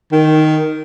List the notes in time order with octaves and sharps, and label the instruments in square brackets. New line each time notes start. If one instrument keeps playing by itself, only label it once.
[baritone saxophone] D#3